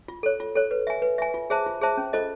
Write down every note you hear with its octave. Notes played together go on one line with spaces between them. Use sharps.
F4
A4 C#5
F4
A4 C#5
B4
E5 G#5
B4
E5 G#5
F4
G#4 C5 E5 A5
F4
G#4 C5 E5 A5
C#4
F4 A4 C5 D#5